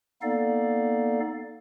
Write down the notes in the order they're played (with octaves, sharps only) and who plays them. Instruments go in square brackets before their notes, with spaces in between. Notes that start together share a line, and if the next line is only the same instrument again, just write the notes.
[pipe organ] A#3 B3 D#4 A4 D5 F5